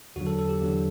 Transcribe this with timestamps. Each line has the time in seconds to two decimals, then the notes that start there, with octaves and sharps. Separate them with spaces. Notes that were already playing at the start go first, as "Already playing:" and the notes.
0.16 E2 D3 F#3 F#4
0.27 A4
0.39 A4
0.49 G4
0.61 E2 D3 F#3